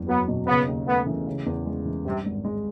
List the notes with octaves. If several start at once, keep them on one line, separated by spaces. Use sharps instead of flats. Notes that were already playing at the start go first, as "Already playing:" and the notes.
Already playing: F#1 E2
F#3 B3
B2
C#3 B3
D#2
A3 B3
E3
C#3
E2
G#3
E3
G2 C3
G#1
G#3